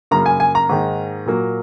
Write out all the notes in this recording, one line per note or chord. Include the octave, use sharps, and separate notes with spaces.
F#2 C#3 A#3 A#5
G#5
G#5
A#5
G#2 D#3 A#3
A#2 F#3 A#3